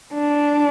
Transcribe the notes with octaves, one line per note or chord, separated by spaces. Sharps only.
D4